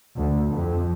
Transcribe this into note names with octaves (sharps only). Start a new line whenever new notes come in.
D2
F2